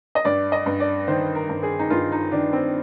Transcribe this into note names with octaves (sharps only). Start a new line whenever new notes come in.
D#5
G2 D5
D#5
G2
D5
D#3 C5
A#4
G2
G#4
D#4
G2 F4
D#4
D#3 D4
C4